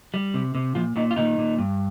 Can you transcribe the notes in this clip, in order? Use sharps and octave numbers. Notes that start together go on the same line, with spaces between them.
G3
C3
C3
A#2 F3 F4
A#2 D#3 D#4
F4
A#2 D#3 D#4
A#2
G2